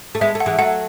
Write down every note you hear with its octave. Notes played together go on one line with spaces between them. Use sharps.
A3
G#3 B3 E5
A3
F#5
E3 G#3
F#3 A3 F#5